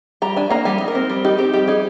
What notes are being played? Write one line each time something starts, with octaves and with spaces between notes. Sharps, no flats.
G3 A#5
D4 G#5
A#3 A#5
G3 G#5
D#4
A#4
C4
G3
D#4 G4
C4 G4
G3 G4
D#4 G#4